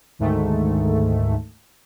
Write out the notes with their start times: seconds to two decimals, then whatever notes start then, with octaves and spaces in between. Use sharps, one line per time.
0.19 D2 G#2 D#3 A3